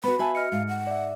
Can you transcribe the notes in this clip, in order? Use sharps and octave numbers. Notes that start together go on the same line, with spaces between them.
B3 F#4 B4 B5
F#4 B4 E5 F5 G#5 A5
D#5 F6 C#7
G#2 F5
F#5
D5 E5